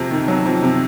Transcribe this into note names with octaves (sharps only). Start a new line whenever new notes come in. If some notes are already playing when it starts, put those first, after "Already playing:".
Already playing: F2 C3
D#3
F#3
F2
C3